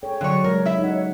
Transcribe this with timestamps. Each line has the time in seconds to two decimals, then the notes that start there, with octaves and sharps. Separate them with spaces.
0.03 G#4 A4 C#5 G5
0.21 D3 F#3 C#5 D5 F5
0.44 C#3 G#3 G#4 A#4 C#5
0.65 E4 E5
0.79 D#4 F#5